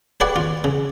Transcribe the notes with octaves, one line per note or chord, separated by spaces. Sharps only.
G4 G#4 B4 C#5 D5 F#5
F4
C#3